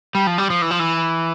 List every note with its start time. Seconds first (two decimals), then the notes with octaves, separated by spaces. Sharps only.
0.15 G3
0.27 F3
0.38 G3
0.50 F3
0.62 E3
0.71 F3
0.79 E3